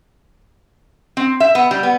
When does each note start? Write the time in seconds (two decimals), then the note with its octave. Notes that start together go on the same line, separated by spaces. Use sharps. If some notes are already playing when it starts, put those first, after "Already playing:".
1.17 C4
1.40 E5
1.55 B3
1.71 G3
1.83 B3